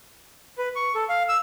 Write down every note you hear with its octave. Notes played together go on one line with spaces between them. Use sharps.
B4
C#6
A4
F5
E6